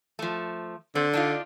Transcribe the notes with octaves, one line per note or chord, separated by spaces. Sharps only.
F3 A3
D3 C4
D4 D#4 F4